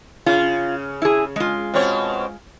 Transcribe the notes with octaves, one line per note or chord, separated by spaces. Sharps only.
C#3 F4
E4 G#4
G#3 F4
B2 C4 C#5